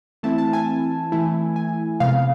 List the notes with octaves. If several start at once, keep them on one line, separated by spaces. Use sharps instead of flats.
E3 A3 C4 E4 A5
A5
G#5
E3 A3 E4
G#5
C3 F3 G#3 B3 F5